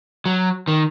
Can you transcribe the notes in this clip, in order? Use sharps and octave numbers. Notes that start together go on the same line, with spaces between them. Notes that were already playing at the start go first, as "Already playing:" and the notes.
F#3
D#3